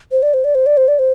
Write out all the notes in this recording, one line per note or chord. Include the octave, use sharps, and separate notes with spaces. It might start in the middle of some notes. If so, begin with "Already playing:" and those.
C5
D5
C5
D5
C5
D5
C5
D5
C5